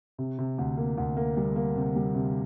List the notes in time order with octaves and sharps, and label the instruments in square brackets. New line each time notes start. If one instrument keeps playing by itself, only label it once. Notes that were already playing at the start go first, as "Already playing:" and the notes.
[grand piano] C3
C3
D2
A#3
D2
A#3
G3
A#3
C3
G3
C3